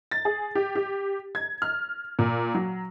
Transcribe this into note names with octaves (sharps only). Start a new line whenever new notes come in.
A6
G#4
G4
G4
G#6
F6
A#2
F#3